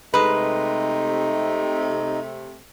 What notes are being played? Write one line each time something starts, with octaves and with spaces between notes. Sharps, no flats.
C3 G#3 A3 D#4 B4